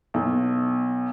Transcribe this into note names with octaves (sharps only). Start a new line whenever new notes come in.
B1